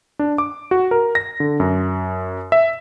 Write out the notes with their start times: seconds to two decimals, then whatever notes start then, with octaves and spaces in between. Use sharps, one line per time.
0.19 D4
0.38 D6
0.71 F#4
0.91 A#4
1.15 A#6
1.40 D3
1.60 F#2
2.52 E5